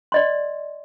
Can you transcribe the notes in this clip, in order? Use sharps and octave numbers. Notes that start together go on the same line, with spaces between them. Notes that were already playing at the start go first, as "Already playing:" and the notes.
D5 D#5 C6